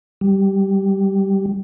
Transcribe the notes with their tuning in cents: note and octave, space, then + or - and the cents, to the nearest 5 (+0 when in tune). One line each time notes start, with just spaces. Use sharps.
G3 -10